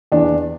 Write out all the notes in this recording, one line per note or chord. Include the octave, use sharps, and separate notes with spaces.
E2 D4